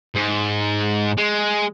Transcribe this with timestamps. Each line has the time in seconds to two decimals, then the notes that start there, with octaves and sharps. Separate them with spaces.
0.15 G#2
1.17 G#3